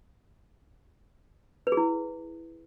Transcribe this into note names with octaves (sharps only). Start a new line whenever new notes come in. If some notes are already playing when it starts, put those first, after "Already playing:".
B4
G#4
E4